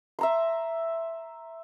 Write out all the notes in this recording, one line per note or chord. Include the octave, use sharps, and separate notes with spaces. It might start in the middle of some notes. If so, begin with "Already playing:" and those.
E5 A#5 C6